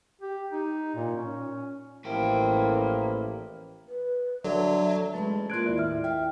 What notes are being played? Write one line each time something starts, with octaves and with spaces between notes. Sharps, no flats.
G4
D#4
A#2
C#4
A1 F3 A#3 E4 B4 G5
B4
D3 F#3 E5
E2 G#3 A3 C#4 B4 A5
A#3 C4 F4 C6 F#6 G#6 D7
D#2 E4 D5
A2 E5 F6
E5 F5 G5